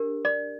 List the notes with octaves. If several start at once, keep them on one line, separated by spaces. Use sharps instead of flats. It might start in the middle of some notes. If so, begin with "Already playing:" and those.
Already playing: D4 G4 A#4
D5